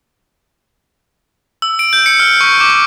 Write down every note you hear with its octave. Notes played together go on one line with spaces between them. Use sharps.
E6
D7
G6
C#7
F6
C#6
D6